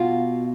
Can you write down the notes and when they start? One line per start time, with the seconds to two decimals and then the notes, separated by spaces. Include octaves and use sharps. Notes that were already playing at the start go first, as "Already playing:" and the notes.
Already playing: B2 F4